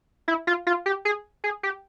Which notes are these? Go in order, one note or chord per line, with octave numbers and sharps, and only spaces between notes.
E4
F4
F4
G4
G#4
G#4
G4